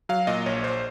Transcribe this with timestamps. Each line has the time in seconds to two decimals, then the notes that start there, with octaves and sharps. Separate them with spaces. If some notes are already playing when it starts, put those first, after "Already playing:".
0.09 F#3 F5
0.27 A#2 D#5
0.46 A#1 C#5
0.64 A#1 C5